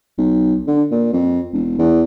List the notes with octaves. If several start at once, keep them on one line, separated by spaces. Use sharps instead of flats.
B1
D3
A#2
F2
E1
E2